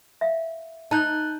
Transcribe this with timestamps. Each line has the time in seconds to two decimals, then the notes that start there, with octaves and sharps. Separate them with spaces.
0.21 E5 F5
0.91 D#4 A5 F#6 G6